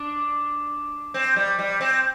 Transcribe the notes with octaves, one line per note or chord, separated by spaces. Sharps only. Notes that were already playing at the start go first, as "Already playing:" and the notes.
Already playing: D4
C4
G3
G3
C4